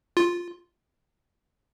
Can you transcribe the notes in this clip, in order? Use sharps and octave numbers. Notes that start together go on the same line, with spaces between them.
F4